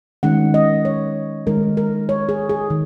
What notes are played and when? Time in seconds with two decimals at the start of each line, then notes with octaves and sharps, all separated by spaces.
0.23 D#3 G#3 C#4 F#5
0.54 D#5
0.85 C#5
1.47 D#3 G#3 D#4 A#4
1.77 A#4
2.09 C#5
2.29 G#4
2.49 G#4
2.70 D#3